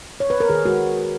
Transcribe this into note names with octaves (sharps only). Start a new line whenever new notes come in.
C#5
B4
A#4
D#3 G#4
G#3 F#4